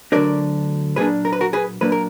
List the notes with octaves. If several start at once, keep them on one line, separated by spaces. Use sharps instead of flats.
D2 D3 F#3 D4 A#4 D5
A#2 F#3 A#3 D4 G#4 B4
A#4
B4
F#4 A#4
G#4 B4
A#2 F#3 A#3 D4 B4
A#4